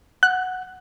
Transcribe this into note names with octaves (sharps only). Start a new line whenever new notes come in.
F#5 F#6